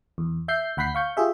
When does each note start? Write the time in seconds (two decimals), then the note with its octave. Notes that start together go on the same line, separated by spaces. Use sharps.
0.18 E2
0.48 E5 G6 C7
0.77 D2 F#5 B5 G6 B6 C7
0.95 F5 C#6 G6
1.17 F4 G4 G#4 E5